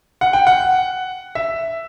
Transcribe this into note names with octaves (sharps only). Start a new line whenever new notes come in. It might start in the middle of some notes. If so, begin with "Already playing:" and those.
F#5
G5
F#5
E5